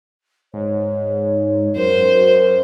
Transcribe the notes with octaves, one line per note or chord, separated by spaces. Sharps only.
G#2 C#5
F#2 A#4 C5